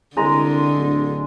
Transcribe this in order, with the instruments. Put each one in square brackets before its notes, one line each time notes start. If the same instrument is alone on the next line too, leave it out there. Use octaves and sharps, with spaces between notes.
[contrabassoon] C2 [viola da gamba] D3 [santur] G#3 A#5
[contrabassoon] D1